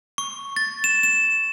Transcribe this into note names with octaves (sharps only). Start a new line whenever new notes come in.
C#6
A6
E7
E7